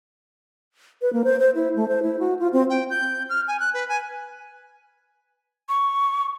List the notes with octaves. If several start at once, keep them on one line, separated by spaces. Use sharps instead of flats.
B4
A#3
C5
C5
E4
A3
C5
E4
F#4
F4
C4
G5
G6
F6
G#5
F#6
B4
G#5
C#6